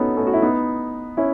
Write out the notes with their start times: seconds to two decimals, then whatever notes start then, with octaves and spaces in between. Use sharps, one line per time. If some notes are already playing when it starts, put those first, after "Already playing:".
Already playing: B3 C#4 D#4 F#4 A4
0.17 A3 C#4
0.27 F#4
0.33 E4
0.42 B3 D#4
1.17 C#4 E4